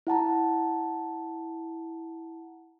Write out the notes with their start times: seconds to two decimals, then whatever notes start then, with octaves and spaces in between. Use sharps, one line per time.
0.07 E4 F#5 A5 A#5